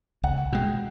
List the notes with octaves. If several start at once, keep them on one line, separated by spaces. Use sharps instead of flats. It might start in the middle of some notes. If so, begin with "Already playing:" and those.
C#2 F#5
B2 G#3 G5